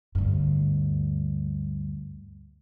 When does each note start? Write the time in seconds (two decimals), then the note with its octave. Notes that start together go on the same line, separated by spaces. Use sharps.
0.15 D2 G2